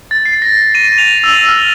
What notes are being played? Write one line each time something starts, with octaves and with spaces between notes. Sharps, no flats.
A6
C7
A#6
D#7
F7
E6
F6